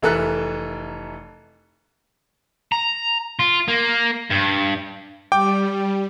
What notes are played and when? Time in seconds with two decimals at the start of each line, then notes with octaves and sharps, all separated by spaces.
0.02 F1 E3 A4 A#4 E5 F#6
2.72 A#5
3.39 F4
3.68 A#3
4.30 G2
5.32 G3 G5 D6